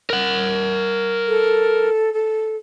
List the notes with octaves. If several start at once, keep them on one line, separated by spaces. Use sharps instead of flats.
A#4 F#5
A4
A4